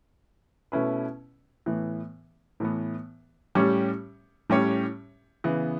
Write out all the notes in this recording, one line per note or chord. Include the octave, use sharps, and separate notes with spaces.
B2 A3 C#4 E4 B4
A2 E3 B3
A2 E3 B3
A2 G3 C#4 G4 C#5
A2 G3 C#4 G4 C#5
C#3 E3 B3